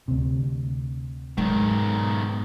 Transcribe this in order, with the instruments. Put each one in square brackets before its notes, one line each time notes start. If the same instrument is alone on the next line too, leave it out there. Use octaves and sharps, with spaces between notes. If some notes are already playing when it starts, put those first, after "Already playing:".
[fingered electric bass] D2 C3
[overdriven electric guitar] B1 D#3 [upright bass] G#2 [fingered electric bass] F#3 G#3